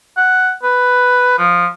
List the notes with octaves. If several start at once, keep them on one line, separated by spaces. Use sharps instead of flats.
F#5
B4
F3